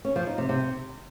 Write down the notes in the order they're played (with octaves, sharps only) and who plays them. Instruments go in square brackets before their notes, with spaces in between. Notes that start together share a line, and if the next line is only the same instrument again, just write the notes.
[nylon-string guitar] C#4
F3
D#4
C3
C3